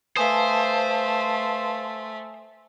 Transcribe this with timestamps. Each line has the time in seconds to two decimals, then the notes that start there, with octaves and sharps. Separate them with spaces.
0.17 A3 B4 C5 F5 G#5 A5 D#6